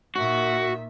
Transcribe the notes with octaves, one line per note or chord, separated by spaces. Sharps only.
A#2 D#3 F#4 E5